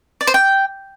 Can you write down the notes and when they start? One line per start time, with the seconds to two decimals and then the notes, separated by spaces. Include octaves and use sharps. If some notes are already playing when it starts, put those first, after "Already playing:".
0.21 D5
0.27 C5
0.34 G5